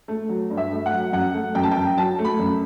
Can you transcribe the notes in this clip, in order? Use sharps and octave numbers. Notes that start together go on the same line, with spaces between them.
A3
F#3
G2
E5
A3
F#5
F#3
F#2 F#5
A3
F#2 G5
A5
F#2 G5
F#3 A5
A3
B5
F#2